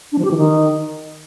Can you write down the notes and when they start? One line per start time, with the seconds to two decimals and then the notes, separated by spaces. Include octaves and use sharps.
0.12 D4
0.18 F3
0.25 G4
0.31 E3
0.37 D#3